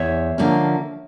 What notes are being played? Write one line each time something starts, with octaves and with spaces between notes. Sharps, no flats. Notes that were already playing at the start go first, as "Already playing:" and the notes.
Already playing: E2 C#5 E5
D3 F3 A#3 C#4